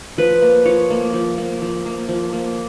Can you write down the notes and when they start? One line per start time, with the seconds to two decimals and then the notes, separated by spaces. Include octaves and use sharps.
0.18 F3 B4
0.42 A#3
0.66 F3 C#5
0.90 A#3
1.13 F3
1.38 A#3
1.62 F3
1.86 A#3
2.08 F3
2.33 A#3